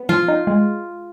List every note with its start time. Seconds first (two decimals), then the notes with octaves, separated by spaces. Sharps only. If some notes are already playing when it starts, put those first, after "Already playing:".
Already playing: B3
0.09 F3 F4
0.28 D#4
0.47 G#3